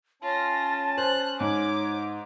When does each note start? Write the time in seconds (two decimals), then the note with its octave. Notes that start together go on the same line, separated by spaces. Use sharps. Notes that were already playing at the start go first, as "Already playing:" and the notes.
0.22 C#4 F4 A5 A#6
0.98 C5 F#6
1.40 G#2 C#5 D6